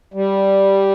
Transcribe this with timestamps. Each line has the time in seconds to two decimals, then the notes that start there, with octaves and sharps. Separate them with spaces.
0.14 G3